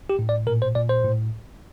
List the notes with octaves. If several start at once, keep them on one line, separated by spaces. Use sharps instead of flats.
G4
A2
D5
A#2 A#4
C5
A#2 D5
C5
A2